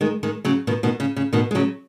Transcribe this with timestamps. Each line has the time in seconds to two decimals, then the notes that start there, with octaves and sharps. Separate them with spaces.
0.01 D#3 G#3
0.23 D#3 G#3
0.45 C#3 F#3
0.67 B2 D#3
0.83 B2 D#3
1.00 C#3
1.16 C#3
1.33 B2 D#3
1.51 G#3
1.55 C#3 F#3